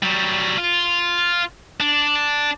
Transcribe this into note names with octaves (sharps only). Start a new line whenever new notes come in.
F#3 G3
F4
D4